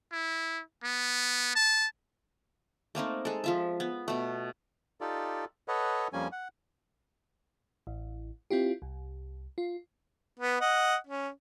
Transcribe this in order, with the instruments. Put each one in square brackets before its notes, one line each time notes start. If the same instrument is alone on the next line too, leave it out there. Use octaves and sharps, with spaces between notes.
[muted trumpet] E4
B3
A5
[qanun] A3 A#3 C4 D#4
G#3 A4
F3 F4 E5
B3
B2 A3
[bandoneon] D#4 F4 G4 A4 D5
A4 B4 C#5 D#5 F#5
F2 F3 G3 A#3 C#4 G#5
F#5
[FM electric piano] A1
C4 E4 F4 G4
C2
F4
[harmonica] B3
D#5 F#5
C#4